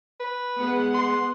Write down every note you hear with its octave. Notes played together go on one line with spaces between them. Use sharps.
B4
G#3 B3 F#5
C6